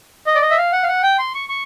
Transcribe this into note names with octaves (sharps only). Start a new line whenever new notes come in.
D#5
D5
D#5
E5
F5
F#5
F5
F#5
G5
C6
C#6
C#6